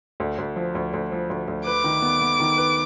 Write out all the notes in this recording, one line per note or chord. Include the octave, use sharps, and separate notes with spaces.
D2
D2
F3
D2
D2
F3
D2
D2
B4 D6
D#3
B3
B3
D#3
B4